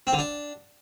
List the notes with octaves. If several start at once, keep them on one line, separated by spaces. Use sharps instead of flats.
C4
D3
D4